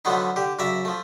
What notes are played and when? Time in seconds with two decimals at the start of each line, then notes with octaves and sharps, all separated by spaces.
0.05 D3 F3 F#3 A3 B3 D#4
0.36 D3 G4
0.59 F#2 C#3 D5 E5 A#5
0.85 F3 A3